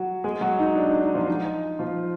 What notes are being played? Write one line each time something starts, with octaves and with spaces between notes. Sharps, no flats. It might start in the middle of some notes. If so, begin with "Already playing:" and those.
Already playing: F#3 F#4
G#3 G#4
F#3 F#4
D#4
D4
D#4
D#4
F3 F4
D#4
F3 F4